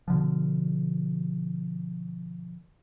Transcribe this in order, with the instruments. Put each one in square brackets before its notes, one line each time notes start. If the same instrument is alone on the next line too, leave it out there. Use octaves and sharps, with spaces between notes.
[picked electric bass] B2 D3 F3